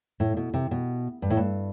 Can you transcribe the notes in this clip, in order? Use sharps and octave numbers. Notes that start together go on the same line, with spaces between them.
A2
B2
C3
B2
G2
A2
G2